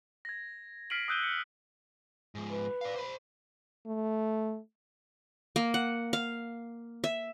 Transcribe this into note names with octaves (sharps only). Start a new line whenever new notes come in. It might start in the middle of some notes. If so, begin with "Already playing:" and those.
G#6 A#6
F6 B6 C7 D7 D#7 F#7
D#6 E6 F#6 G6 D#7 G7
C#7
G#2 F3
B4
D5 F5
C5 B5
A3
A#3
F#5
F5
E5